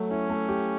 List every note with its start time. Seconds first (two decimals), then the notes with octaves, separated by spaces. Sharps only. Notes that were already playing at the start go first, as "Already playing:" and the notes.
Already playing: F#3 A3
0.11 C#4 E4
0.30 A3
0.49 G4